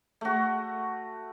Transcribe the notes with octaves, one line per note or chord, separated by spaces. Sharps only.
A3 F#4